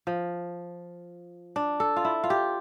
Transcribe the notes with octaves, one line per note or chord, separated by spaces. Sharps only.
F3
D4
A4
F4
E4
F4
G4